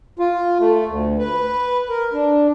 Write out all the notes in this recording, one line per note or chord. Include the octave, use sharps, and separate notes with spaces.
F4
A3
D2
B4
A#4
D4